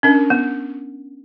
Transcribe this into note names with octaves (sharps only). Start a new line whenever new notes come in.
C#4 D4 A#4
B3